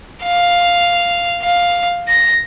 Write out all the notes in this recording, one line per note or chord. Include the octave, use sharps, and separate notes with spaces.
F5
F5
A#6